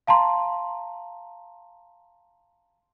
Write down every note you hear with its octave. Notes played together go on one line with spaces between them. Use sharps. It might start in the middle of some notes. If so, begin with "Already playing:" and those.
F5 A5 A#5 C6